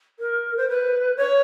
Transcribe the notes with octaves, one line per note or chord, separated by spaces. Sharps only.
A#4
C5
B4
C#5